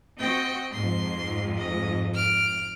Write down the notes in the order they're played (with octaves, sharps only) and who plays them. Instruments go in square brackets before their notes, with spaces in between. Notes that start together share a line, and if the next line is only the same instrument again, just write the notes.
[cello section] C4 F#4 [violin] D#5 G5
[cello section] F2 G#2 [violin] C6
[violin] D#5
F6 D7